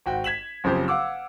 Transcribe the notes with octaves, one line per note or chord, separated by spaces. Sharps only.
G#1 F#4 G5
G#6 B6 E7 F#7
F#1 C#3 F3 C4 G4 C5
F5 F#5 D6 E6